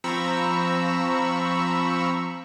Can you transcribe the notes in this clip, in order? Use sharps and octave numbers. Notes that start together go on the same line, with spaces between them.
F3 C4 A#5 B5 C#6 E6